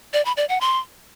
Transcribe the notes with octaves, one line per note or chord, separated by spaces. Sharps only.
D5
B5
D5
F#5
C6